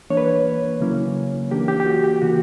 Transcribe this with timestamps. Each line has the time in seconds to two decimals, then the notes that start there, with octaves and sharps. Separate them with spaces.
0.10 E3 A#3 D4 C#5
0.17 B4
0.24 C#5
0.80 C#3 F#3 A#3 C#4 E4
1.51 E3 A#3 D4 G4
1.68 G4
1.80 G4
1.86 F#4
2.04 G4
2.22 C#3 E3 A#3 F#4